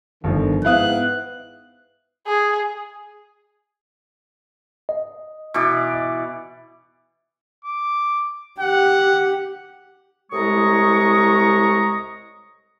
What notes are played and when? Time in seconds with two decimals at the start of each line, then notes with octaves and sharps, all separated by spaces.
0.24 G1 D3 D#3 F3
0.65 G#2 B3 E4 F5 D#6 F#6
2.27 G#4
4.89 D#5
5.54 B2 E3 D5
7.65 D6
8.60 G4 F#5
10.32 C2 A2 G#3 A#5 C#6 D#6